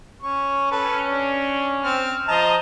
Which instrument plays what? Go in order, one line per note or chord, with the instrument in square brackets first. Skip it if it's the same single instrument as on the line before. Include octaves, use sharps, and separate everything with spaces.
[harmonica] C#4 C#6
[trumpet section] C#4 [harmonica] A4 B4
[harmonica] D4
C4 F6
[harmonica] F3 A5 A#5 [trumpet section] C5 D#5